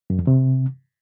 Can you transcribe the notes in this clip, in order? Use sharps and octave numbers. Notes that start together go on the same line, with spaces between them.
F#2
F2
C3